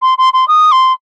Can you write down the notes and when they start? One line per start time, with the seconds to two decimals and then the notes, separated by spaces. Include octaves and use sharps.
0.02 C6
0.18 C6
0.33 C6
0.48 D#6
0.72 C6